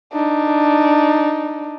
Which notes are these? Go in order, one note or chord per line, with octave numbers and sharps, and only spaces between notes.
D4 D#4